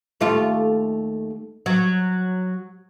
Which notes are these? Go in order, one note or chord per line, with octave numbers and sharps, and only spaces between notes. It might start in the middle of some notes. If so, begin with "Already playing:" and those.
D#2 A3 F4
F#3